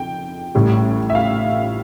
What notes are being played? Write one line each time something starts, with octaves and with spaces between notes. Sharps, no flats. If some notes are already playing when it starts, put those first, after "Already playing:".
Already playing: F2 G5
A1 A2 G3
E5
F5